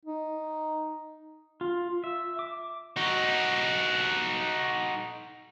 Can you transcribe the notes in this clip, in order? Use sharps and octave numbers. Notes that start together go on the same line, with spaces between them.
D#4
F4
E5
D6
D#4 F#4